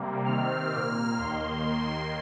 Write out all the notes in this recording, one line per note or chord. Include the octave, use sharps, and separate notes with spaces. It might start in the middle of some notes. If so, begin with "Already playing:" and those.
Already playing: C3 G3 A#3
C3 D#3 C4 F6
A#2 A#3
D#2 D#3 A#3 C6